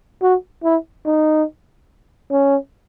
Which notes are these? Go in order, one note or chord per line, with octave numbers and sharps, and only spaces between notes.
F#4
E4
D#4
C#4